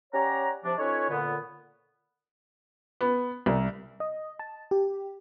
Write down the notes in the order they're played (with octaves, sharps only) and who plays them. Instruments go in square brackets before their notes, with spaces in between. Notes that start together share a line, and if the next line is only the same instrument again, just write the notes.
[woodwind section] C#4 G4 C#5 D5 F#5 A#5
C3 F3 D4
C#4 D#4 F4 A4 B4 C#5
A#2 D3 B3
[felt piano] B3
C2
[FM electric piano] D#5
A5
G4